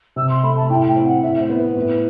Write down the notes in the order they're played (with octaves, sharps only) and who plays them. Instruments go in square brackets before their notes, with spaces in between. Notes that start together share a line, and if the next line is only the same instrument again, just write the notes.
[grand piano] C3 [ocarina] E6
[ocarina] C6
[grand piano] A3 [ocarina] B5
[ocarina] A5
[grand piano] A2 [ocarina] G5
[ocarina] G5
[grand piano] C4
[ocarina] F#5
[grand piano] A2 [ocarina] E5
[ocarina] C5
[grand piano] B3
[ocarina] B4
[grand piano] A2